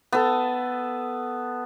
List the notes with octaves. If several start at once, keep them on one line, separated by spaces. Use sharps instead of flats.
B3 A4